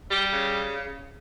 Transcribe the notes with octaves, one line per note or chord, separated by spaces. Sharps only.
G3
C#3